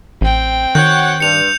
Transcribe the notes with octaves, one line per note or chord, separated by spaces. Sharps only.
A1 C4 G5
D#3 F#4 C#5 F#5 G6
G2 C#7 F7